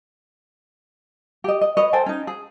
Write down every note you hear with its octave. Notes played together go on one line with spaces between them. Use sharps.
G4 D#5
D#5
B4 C#5 D#5
A4 C5 G5 G#5
C#4 D#4
G#4